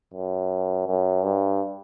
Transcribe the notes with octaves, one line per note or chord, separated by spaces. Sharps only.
F#2
F#2
G2